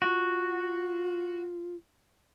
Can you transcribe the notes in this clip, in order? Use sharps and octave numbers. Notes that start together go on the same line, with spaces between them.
F4 F#4